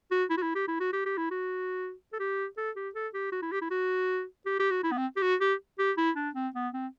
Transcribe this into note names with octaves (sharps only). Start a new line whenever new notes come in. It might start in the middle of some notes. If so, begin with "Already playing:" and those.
F#4
E4
F#4
E4
G4
E4
F#4
G4
G4
E4
F#4
A4
G4
A4
G4
A4
G4
F#4
E4
G4
E4
F#4
G4
G4
F#4
E4
B3
C4
G4
F#4
G4
G4
E4
D4
C4
B3
C4